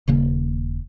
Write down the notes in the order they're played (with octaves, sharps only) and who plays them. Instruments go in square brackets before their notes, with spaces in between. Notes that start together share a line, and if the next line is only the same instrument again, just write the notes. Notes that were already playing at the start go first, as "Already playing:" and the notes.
[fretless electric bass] D#1 C#3 A#3